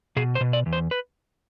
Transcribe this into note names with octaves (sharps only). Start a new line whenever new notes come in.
B2 G#4
C5
B2
D5
E2
C5
B4